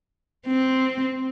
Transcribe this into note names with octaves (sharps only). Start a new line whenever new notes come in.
C4